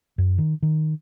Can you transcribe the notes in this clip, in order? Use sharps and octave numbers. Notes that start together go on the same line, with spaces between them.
F#2
D#3
D#3